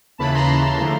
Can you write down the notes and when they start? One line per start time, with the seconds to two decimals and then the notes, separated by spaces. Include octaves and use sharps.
0.18 D#2 C#3 E3 A5 B5
0.34 A#5 C6
0.50 A#5 C6
0.81 D3 F3 A3